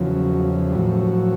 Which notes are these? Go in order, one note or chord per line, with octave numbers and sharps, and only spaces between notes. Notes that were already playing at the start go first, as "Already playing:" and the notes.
Already playing: E2 C#3 F3 F#3
G3
A2 F3 F#3